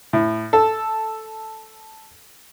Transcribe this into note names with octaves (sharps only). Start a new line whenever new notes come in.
A2
A4